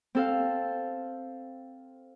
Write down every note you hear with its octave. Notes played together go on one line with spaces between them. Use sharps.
C4 A4 F5